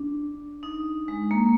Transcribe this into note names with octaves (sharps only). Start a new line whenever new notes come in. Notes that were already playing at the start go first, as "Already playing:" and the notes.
Already playing: D4
D#4
G#3
A#3